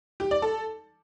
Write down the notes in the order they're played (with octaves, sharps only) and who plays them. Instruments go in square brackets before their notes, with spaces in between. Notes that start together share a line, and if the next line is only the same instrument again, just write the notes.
[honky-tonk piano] G4
D5
A4